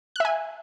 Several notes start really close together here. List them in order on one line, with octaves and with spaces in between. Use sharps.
F#6 E5 G#5